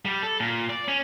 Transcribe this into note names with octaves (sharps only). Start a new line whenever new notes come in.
G3
A4
A#2
D5
C#4